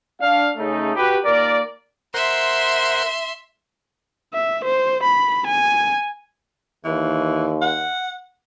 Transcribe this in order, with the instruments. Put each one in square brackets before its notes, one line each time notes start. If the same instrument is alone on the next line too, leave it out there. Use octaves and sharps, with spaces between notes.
[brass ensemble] D4 F5
C#3 A3 D#4
F#4 G4 B4
D#2 A#2 A#3 A#4 D5
[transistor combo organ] A#4 C5 F#5 [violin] E5 C6
[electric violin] E5
C5
B5
G#5
[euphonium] D#2 [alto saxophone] E3
[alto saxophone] F#5